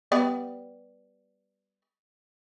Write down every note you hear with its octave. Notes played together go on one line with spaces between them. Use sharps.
G3 B3 D5